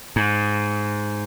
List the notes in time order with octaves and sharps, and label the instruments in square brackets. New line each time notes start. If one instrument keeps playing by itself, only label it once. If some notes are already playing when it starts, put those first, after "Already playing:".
[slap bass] G#2